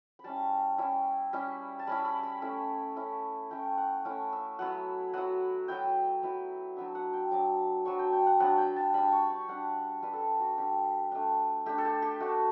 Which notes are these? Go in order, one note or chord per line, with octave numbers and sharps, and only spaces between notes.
B5
G3 C#4 E4 A5
G3 C#4 E4
G3 C#4 E4
A5
G3 C#4 E4 B5
B5
B5
A3 C#4 E4
A3 C#4 E4
A3 C#4 E4 G5
F#5
A3 C#4 E4
E5
F#3 B3 E4 F#5
F#3 B3 E4 F#5
F#3 B3 E4 G5
F#3 B3 E4
F#3 B3 D4 E5
F#5
G5
F#3 B3 D4 D6
F#3 B3 D4 C#6
G5
G5
F#5
F#3 B3 D4 F#5
G5
A5
G3 D4 B5
C#6
C#6
G3 D4 F#5
G3 D4 B4
A4
G4
F#4
G3 D4 G4
A3 D4
A3 D4 G4
A4
G4
G4
A3 D4 F#4